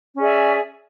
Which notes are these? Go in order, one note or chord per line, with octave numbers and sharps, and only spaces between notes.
C#4 G#4 D5 E5